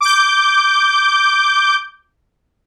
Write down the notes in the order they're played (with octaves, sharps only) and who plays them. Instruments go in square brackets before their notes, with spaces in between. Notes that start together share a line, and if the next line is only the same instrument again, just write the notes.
[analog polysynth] D6 G6